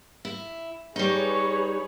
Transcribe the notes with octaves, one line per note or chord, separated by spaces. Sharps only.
E4
G3 D#4 G#4 B4 C#5